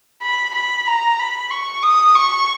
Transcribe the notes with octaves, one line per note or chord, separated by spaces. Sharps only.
B5
B5
A#5
B5
C#6
D#6
C#6